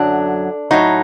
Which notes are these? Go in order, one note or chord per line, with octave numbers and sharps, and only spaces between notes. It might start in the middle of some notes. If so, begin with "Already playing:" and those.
Already playing: F#2 D3 F#3 D4
A2 F#3 D#4